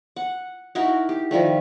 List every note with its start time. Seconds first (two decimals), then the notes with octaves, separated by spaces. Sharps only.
0.16 F#5
0.75 D#4 E4 F#4 A#4
1.09 G4
1.31 D#3 F3 G3 A3